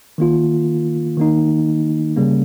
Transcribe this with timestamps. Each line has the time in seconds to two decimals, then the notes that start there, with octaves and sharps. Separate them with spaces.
0.18 D#3 A#3 F4
1.17 D#3 A#3 D#4
2.16 C#3 G3 A#3 C#4